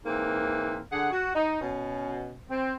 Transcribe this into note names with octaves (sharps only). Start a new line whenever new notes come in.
G#2 E3 A#3 C4
D3 G#4 F#5
F#4
D#4
B2 C#4
C4